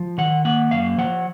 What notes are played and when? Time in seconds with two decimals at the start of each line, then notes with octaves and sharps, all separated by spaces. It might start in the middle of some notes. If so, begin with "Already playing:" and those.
Already playing: F3
0.18 D#3 F#5
0.45 A#3 F#5
0.71 F#2 F5
0.98 F3 F#5